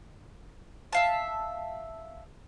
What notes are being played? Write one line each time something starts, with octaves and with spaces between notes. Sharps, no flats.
E5 F5 A5